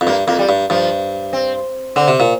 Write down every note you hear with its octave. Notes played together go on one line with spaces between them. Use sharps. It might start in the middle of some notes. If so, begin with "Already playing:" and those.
F2
G2 A#3
F2 A#3
G3
G2
G2 F3
C4
D3 C4
C3
A#2